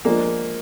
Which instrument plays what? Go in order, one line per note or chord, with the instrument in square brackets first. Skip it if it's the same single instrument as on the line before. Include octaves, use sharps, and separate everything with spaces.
[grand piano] F3 G#3 D4 G#4 [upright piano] A#3